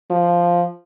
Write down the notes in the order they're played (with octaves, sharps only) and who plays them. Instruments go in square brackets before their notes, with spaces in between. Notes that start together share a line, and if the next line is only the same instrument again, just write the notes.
[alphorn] F3